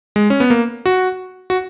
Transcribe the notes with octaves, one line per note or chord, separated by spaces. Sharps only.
G#3
C#4
B3
A#3
F#4
F#4